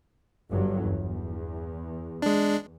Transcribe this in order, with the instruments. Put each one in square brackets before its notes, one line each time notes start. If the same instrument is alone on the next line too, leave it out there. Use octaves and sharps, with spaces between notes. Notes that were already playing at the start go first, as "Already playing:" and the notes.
[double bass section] G1 G2 F#3
E2
[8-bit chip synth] G#3 D4